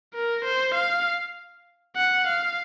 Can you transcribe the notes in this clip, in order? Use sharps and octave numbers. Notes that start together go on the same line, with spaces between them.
A#4
C5
F5
F#5
F5